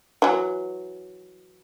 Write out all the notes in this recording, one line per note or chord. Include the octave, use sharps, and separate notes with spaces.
E3 F#3